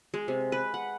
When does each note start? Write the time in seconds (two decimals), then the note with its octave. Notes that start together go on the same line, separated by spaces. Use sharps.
0.14 G#3
0.28 C3
0.52 B4
0.74 F#5